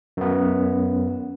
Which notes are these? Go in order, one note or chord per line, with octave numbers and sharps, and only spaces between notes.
F#2 B3